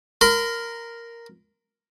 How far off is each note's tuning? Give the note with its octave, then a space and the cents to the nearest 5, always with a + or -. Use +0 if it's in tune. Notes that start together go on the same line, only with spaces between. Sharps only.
A#4 +0 B5 +45